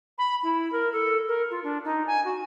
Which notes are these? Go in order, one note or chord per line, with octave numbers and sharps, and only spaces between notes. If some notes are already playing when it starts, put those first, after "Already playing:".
B5
E4
A#4
A4
A#4
F4
D4
D#4
G#5
F#4